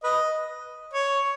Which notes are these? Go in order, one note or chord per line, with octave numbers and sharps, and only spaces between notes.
B4 D#5
C#5